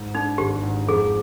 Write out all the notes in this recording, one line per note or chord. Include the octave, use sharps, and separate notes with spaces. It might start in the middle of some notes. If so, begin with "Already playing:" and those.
Already playing: G#2
D4 D#4
G#1 G4
G#2
F2 G#4